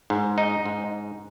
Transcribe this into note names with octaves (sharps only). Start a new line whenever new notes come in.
G#2
D#4
G#2